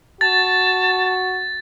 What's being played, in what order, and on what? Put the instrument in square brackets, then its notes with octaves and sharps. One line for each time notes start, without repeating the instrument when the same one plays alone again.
[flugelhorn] F#4 [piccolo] A5 [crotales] A6